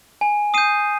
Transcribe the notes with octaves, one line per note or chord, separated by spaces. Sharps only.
G#5
D#6 G6 C7 D#7